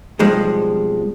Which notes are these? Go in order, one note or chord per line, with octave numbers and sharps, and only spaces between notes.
B1 F2 F3 G3 G#3